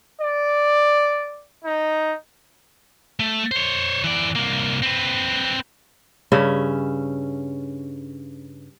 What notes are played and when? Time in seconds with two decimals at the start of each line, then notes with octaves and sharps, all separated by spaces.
0.20 D5
1.64 D#4
3.20 A3
3.51 C5 C#5
4.04 E3 D5
4.35 C2 A#3
4.83 C4 B4
6.32 G2 C#3 C#4 E5